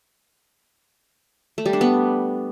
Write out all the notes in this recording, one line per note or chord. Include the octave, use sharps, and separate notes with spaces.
A3
G3
D4
B3